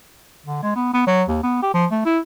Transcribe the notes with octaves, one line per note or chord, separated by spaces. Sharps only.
D3
G#3
B3
B3
F#3
D#2
B3
G4
F3
A3
E4